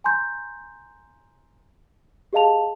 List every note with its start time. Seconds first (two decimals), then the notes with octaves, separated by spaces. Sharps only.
0.04 G#5 A#5 C6 G6
2.33 G4 G#4 D#5 F5 A5 F7